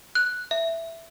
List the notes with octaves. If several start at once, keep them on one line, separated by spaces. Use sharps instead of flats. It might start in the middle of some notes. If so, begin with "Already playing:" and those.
F#6
E5